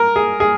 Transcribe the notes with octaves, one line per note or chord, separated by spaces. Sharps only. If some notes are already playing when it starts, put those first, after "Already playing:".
Already playing: A#4
G#4
G#4